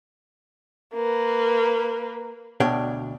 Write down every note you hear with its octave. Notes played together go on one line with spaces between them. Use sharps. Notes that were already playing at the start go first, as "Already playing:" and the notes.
A#3 B4
D2 B2 D4 C#5 G5